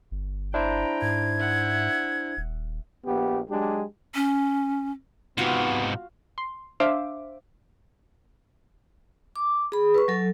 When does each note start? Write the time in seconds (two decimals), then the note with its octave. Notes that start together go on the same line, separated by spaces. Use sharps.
0.11 G1
0.54 D4 E4 C5 G5 A#5
1.02 G#2 G#6
1.38 E5 F#5
2.37 D#1
3.05 A#1 B3 G4
3.48 F#3 G#3 D4 G4
4.15 C#4
5.38 G#2 C3 B3 F4 F#4 F5
6.38 C6
6.80 D4 C5 E5 F5 D6
9.36 D6
9.72 G#4 B5
9.94 B4 C#6
10.08 F#3 A4